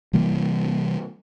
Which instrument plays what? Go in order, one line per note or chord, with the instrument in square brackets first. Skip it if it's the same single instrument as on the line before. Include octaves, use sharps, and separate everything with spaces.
[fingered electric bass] C3 E3 G3 A#3